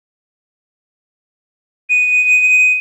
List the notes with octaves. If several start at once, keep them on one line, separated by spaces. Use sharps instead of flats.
D#7